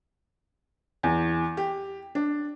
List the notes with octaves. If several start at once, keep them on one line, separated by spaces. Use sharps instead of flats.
E2
G4
D4